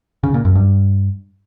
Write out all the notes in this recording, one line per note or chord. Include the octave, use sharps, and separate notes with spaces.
C#3
A#2
F#2
G2